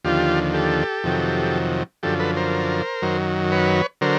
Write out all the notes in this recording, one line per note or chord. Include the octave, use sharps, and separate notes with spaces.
D#2 D3 F3 F4 G4
G4 A4
F2 C3 D#3 F#3
F#2 D3 F3 G4 A4
A4 B4
A#4 C5
F#2 D#3 F#3
B4 C#5
D3 F#3 A#4 C5